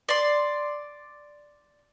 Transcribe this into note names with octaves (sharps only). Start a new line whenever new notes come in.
D5 C6